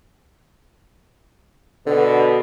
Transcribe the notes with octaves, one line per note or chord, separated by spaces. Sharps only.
B2 D3